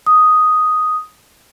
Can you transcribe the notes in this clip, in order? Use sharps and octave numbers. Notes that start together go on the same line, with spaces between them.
D#6